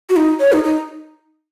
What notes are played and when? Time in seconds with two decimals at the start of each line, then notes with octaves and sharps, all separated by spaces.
0.10 F#4
0.16 D#4
0.40 C#5
0.53 D#4
0.64 D#4